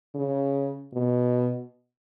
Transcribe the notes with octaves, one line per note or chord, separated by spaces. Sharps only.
C#3
B2